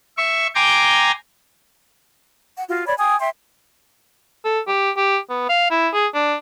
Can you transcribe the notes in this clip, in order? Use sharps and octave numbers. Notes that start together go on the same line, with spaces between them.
E5 C#6
G5 G#5 A#5 C6 D6 G#6
F#5
F4 F#4
C#5 D5 B5
G5 G#5 D#6
E5 G5 C6
A4
G4
G4
B3
F5
E4
G#4
D4